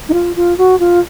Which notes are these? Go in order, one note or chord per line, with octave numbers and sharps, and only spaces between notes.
D#4
F4
F4
F#4
F4